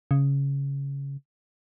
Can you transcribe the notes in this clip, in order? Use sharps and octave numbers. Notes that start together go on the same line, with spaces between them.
C#3